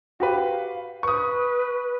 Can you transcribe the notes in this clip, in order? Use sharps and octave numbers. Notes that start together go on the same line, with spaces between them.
F#4 G4 B4 F5
B4 C#6 D#6